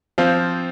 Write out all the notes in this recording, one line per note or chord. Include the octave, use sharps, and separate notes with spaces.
F3 C4 F5